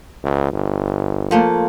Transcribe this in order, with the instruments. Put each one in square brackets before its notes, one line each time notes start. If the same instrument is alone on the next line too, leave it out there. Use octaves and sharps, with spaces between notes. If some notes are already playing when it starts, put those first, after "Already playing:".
[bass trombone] C#2
G1
[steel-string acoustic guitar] F3 A3 A#3